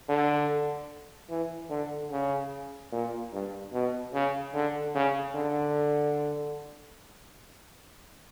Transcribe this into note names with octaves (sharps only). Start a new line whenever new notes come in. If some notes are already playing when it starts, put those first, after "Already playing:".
D3
E3
D3
C#3
A#2
G2
B2
C#3
D3
C#3
D3